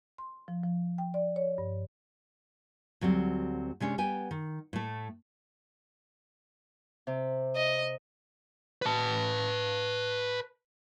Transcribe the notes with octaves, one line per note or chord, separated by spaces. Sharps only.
C6
F3
F3
G5
D5
C#5
G2
D2 F#3 G3 C4
C3 G#3 C#4 D4
G3 B3 G5 G#5
D#3
A2 A3
C3
D#5
B4 A5